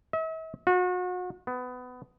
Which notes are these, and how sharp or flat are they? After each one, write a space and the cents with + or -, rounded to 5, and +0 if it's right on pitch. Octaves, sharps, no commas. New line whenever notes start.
E5 -45
F#4 -35
B3 +20